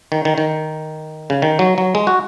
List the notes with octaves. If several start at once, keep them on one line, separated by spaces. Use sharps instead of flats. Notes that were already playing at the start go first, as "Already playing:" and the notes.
D#3
D#3
D#3
C#3
D#3
F#3
F#3
G#3
F#4